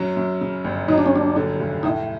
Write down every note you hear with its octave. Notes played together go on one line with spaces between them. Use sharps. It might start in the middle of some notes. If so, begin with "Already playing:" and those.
Already playing: F#2 F#3
F#2
C#3
G1
F#3 D#4
D4
C#4
D#2 D4
D3
F1
A2 D#4